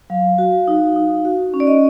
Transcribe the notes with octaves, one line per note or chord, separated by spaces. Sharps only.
F#3 F5
F#4
D#4
D#4
F#4
C#4
D5
D#5